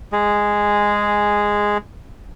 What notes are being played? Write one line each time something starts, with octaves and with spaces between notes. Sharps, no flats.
G#3 G#4